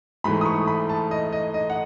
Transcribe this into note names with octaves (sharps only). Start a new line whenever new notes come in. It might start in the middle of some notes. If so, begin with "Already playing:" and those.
G#2 E3 A3 B5
D#6
C#6
B5
A5
D#5
D#5
D#5
F#5